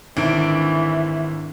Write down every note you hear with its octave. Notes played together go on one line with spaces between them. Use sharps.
G#1 D3 E3 D7